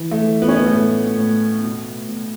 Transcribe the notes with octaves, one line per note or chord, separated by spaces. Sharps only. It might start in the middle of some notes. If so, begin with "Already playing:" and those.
Already playing: E3
A3
E3
B3
C#4
B3
A3
A2 B3
A2
B2
B2